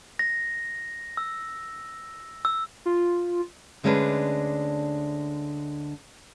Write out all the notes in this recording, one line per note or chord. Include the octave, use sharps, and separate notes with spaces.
A#6
E6
E6
F4
D2 D3 G#3 C#4 D4 B4